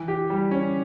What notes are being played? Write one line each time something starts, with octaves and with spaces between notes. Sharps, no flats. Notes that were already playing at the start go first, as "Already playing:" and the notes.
Already playing: E3
G4
G3
C#4